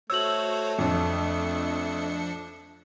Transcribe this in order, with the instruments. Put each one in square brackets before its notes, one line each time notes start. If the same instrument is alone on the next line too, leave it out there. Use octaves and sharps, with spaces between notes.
[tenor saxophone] A3 [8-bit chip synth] F#4 C5 C#5 [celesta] E6 F#7
[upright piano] F2 [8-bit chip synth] F3 D4 C#7